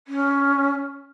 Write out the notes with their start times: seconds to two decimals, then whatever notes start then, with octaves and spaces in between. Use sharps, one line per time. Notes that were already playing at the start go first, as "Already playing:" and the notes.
0.07 C#4